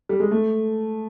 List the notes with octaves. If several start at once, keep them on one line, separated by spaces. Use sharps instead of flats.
G3
G#3
A3